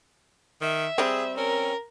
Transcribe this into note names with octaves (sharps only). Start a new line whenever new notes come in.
D#3 E5
G3 C4 G#4
C#4 A#4